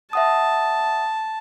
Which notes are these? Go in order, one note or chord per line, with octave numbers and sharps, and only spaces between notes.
E5 F#5 A5 D#6